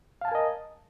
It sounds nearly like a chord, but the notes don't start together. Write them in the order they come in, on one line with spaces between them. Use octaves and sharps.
F5 A5 G#5 A#4 D#5